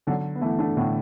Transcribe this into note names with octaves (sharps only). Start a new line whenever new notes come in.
D3 F#3
B3
E3 A3
A3 D4
A2 D3